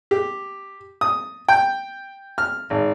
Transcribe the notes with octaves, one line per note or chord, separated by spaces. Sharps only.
G4
D#6
G5
F6
G#1